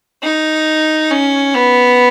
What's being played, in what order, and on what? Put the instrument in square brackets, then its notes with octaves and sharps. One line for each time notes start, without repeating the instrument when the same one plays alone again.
[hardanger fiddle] D#4
C#4
B3